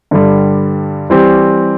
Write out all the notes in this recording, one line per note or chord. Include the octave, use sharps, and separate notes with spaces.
G2 D3 G3
E3 G3 C4 G4